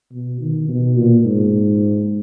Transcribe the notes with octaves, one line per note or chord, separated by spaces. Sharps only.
B2
D#3
B2
A#2
G#2